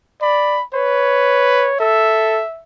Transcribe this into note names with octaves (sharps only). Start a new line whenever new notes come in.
D5 B5
B4 C#5
A4 E5